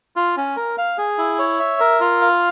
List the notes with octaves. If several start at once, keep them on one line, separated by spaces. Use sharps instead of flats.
F4
C#4
A#4
F5
G#4
E4
C#5
E5
A#4
F4
F5